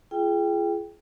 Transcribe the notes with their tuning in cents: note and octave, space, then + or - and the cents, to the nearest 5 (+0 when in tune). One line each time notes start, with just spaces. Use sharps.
F4 -35 G#4 +15 G5 +5